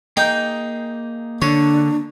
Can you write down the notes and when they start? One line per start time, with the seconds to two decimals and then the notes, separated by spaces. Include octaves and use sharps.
0.17 A#3 D#4 G#4 G5
1.42 D3 D4 C#5